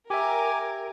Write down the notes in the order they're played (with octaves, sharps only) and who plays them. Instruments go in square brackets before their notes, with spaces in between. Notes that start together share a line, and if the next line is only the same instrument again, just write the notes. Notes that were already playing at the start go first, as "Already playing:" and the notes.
[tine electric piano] G4 E5 [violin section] A#4 [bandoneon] G#5 D6